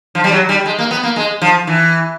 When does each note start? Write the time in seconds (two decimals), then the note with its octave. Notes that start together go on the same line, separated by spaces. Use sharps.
0.15 F3
0.24 G3
0.32 F#3
0.49 G3
0.66 G#3
0.78 A#3
0.91 B3
1.03 A#3
1.16 G#3
1.42 F3
1.67 E3